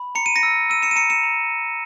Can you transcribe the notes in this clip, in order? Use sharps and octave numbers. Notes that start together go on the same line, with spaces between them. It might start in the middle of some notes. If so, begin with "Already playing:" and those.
Already playing: B5
A#5 C#7
D#7
A#6 C#7
E6
E6 D#7
C#7 E7
D#7
A#5 C#7 E7
C#7 E7
A#5